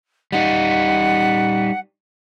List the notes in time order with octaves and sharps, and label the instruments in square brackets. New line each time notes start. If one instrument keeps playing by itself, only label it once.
[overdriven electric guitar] G3 D#4 [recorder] F#5